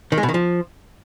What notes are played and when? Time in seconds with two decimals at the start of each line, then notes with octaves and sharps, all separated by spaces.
0.12 D#3
0.18 G#3
0.23 B2
0.29 D#3
0.34 F3